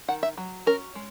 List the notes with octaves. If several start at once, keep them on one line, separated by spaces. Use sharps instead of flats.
D#3 F#5
E5
F#3
C#4 A#4
G#3